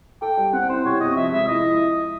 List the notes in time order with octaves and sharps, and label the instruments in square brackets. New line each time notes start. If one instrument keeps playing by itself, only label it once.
[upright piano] A4 [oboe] G5
[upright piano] G3
[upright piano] C4 [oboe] F#5
[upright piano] E4 [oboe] C5
[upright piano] C3 [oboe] C#5
[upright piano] C3 [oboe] D#5
[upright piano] F3 [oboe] E5
[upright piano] G#3 [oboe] E5
[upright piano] E4 [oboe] D#5